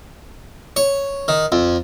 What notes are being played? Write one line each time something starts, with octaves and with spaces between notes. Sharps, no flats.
C#5
D#3
F2